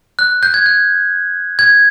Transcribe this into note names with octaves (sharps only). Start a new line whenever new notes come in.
F#6
G6
G#6
G6
G#6